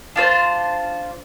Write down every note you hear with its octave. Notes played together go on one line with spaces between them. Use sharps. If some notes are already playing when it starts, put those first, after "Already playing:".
D4 F4 C5